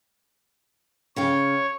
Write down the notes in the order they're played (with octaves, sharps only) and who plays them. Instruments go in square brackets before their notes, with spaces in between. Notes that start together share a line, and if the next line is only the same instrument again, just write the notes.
[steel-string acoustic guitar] C#3 F5 G5 [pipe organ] C#5